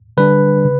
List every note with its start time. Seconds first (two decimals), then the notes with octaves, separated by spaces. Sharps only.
0.17 D3 G3 D4 B4
0.65 C#3